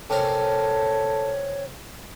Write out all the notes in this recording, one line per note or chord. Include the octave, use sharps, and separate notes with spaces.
C3 C#4 A4 A#4 C#5